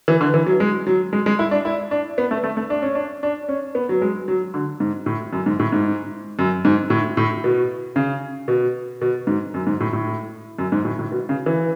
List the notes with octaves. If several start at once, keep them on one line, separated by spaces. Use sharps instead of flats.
E3
D3
E3
F#3
G#3
F#3
G#3
G#3
E4
D4
E4
D4
B3
A3
A3
A3
D4
C#4
D4
D4
C#4
B3
F#3
G#3
F#3
D3
G#2
A2
F#2
G#2
A2
G#2
F#2
G#2
A2
A2
B2
C#3
B2
B2
G#2
F#2
G#2
A2
A2
F#2
G#2
A2
A2
B2
C#3
E3